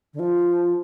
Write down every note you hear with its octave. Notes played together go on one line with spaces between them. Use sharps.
D3
F3